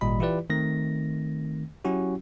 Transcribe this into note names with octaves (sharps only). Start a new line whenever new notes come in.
G#1 A#2 G3 D#5 B5
E3 E4 F4 G4 B4 D5
D#3 A3 C4 A#6
F#3 C#4 E4 F#4 G4